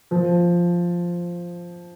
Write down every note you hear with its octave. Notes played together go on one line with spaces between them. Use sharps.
F3